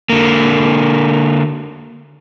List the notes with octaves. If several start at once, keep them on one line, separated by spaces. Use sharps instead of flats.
D3 A#3